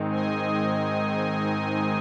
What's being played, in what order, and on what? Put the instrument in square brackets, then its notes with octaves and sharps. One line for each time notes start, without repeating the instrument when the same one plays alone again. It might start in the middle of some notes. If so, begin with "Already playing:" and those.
Already playing: [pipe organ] G#2 D#3 G#3 C4 D#4
D#5 G#5